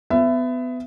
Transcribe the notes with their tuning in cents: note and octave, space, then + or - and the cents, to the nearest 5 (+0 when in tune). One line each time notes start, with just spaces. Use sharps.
B3 +25 E5 +20